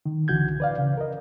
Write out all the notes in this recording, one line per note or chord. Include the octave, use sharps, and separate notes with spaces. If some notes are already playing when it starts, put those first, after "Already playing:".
D#3
C#2 D3 E3 F#4 G6 G#6
B4 D5 F5
C#3
A#4 D#5